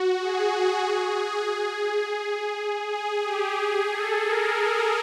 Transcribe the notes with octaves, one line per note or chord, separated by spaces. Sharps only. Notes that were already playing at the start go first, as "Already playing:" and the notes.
Already playing: F#4
G#4
G#4
G4
G#4
A4
A#4